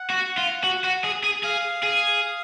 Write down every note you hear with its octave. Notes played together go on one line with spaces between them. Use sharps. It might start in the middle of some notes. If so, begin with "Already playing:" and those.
Already playing: F#5
F#4
F4
F#4
F#4
G#4
G#4
G#4 F5
G#4